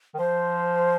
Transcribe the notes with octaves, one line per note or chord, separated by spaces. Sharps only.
D#3
F3 C5